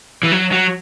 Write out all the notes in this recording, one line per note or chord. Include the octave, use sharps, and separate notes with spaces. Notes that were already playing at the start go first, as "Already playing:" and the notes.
E3
F#3
F#3